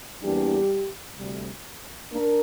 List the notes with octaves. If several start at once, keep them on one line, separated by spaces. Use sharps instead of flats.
E2 E3 G3 A#3 D4 G4
D2 C3 G3
A#3 D4 A#4